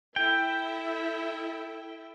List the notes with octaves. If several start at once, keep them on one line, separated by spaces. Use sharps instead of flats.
E4 A4 E5 G5